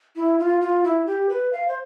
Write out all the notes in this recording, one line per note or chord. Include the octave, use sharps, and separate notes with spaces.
E4
F4
F4
E4
G4
B4
F5
C5